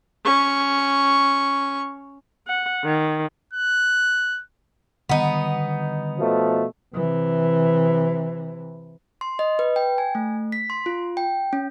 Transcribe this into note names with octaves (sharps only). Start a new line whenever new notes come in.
C#4 C#6
F#5
D#3
F#6
D3 D#3 G3 B3 D#4
B2 F3 A3
C3 E3
C6
D#5
B4
G5
G#5
A3
B6
C6
F4
G5
C#4